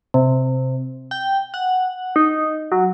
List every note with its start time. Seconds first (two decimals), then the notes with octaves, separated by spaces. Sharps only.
0.14 C3
1.11 G5
1.54 F#5
2.16 D#4
2.72 F#3